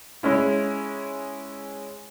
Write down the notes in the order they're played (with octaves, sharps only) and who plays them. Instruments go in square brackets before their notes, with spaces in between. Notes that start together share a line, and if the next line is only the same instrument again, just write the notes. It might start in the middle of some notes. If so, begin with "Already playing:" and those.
[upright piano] G#3 C#4 E4